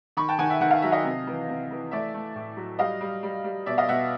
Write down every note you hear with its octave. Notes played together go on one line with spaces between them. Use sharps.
D#3 B5 C#6
G5 A5
D#3 F#5 G#5
E5 F#5
D#3 F#5
F5
F#3 E5
D#5 F5
C3
E3
C3
E3
A3 D5 E5
A3
A2
F#3
G3 D#5 F5
G3
G3
G3
B2 D5 E5
D#5 F5
B2 E5 F#5